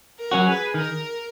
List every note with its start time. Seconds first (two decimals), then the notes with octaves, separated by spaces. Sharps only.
0.18 A#4
0.31 F#3 C#4 F#4
0.46 G#4 B4
0.74 D#3 A#4